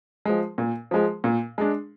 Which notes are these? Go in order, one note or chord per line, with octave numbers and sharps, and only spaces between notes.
F3 G#3
A#2
F3 G#3
A#2
G#3 D4